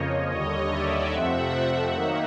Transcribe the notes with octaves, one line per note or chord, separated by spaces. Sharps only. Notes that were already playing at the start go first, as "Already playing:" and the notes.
Already playing: F2 C#3 F3 A#3 C#5 D#5
D#2 D3 G3 C#5 D#5
D5 E5
F2 C3 F3 A3 C4 E5 F#5
D#3 F#3 A#3 D#4